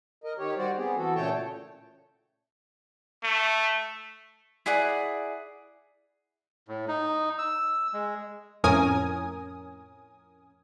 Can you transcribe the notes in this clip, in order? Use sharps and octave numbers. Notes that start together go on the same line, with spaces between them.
A#4 D#5
D#3 G4 C#5
G3 F#4 C5 D5
B3 C4 G4 G#4
E3 F#4 A4
A#2 C#3 A3 C#5 G5 A5
A3
E4 G#4 D5 F#5
A2
D#4
E6
G#3
F2 A2 C#4 A#4 G#5 D#6